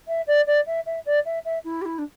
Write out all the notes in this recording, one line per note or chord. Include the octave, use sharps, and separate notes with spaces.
E5
D5
D5
E5
E5
D5
E5
E5
E4
G4
E4
D4